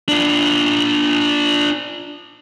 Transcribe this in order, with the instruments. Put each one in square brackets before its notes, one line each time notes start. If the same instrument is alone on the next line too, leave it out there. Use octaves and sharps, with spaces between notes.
[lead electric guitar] D4 F4